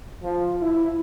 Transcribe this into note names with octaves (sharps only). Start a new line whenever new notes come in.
F3
E4